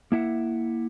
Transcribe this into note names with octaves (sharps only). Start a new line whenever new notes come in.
A#3 E4 E5 F#5